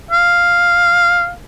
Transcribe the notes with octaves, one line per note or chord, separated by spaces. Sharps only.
F5